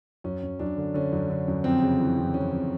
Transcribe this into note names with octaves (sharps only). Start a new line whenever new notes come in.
F#2 C#4
F#2
F#2 D4
D3
D3 C#4
F#2
D3
F#2
F2 C4
C#3
E3
F2
F2 C#4
F2